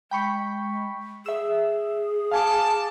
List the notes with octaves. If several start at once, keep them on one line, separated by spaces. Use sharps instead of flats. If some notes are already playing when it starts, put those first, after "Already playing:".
G#3 G5 B5 C#6
G#4 E5 E6
F5 G#5 A5 D6